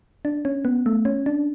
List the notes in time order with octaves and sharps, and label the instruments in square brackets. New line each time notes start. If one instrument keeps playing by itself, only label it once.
[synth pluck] D4
C#4
B3
A3
C#4
D4